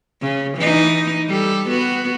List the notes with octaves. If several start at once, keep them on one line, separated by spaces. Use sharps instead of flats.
C#3
E3 D#4
G3 A4
B3 F#4